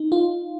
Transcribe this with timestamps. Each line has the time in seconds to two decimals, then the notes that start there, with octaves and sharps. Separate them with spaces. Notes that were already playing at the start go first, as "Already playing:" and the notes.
Already playing: D#4
0.12 F4